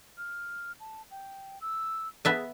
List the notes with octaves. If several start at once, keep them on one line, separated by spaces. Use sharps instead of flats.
F6
A5
G5
E6
B3 G#4 E5 A5